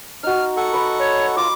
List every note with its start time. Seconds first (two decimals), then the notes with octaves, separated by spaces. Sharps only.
0.23 D#4 F#4 F6
0.57 A4 F#5 C#6
0.73 B4 D#5
0.99 C#5
1.37 F4 D#5 C6 D6